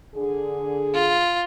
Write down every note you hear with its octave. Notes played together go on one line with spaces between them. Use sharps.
D3 G#4
F4